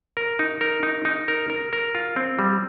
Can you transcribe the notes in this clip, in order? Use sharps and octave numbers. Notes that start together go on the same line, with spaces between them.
A#4
D#4
A#4
D#4
D#4
A#4
A#4
A#4
F4
C4
G3